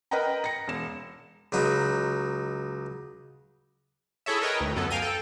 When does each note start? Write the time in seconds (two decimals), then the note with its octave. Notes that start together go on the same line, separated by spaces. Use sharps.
0.11 A#4 B4 D#5 F#5 G5 A#5
0.44 A#6 C#7
0.68 E1 E7
1.52 C#2 F#3 D#4 B4
4.26 E4 G#4 A4 C#5 E5
4.42 A#4 B4 C#5 D#5 G5
4.60 D2
4.76 F#2 B3 A4
4.90 F5 G5 G#5 A#5 D#7
5.02 A4 G5